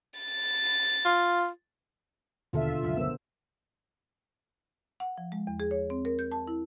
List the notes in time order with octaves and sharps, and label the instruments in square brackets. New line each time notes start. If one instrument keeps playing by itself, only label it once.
[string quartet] A6
[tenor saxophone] F4
[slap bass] D#2 [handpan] B2 D3 A4 [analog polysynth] F4 E5
[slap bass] C#2 F#2 F3
[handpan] B3 A#4 C5 [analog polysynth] E6
[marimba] F#5
F3
G#3
E2
G#4
C#5
C4
A#4
G6
A5
E4